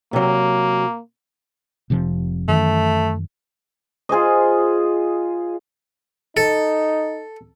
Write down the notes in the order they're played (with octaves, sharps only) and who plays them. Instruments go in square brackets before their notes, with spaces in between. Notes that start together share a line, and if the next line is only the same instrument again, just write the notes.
[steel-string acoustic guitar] C3 F#3 [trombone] A#3
[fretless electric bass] F1 C3 F3
[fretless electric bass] F#2 D#3 E3 [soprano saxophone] A3
[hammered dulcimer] F4 G#4 C5 D#5
[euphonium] D#4 [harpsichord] A4